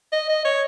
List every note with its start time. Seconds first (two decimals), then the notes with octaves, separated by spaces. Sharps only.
0.12 D#5
0.29 D#5
0.45 C#5